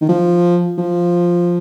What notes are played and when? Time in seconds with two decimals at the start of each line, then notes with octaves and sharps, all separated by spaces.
0.01 D#3
0.09 F3
0.78 F3